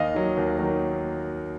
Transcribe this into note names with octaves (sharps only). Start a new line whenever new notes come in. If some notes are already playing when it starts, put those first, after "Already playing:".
Already playing: D#2 D#5 F5
D#3 F#3
D#2
D#3 F#3